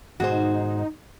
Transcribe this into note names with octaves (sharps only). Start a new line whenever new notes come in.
G#2 B2 D#3 D#4 F#4 G#4 C5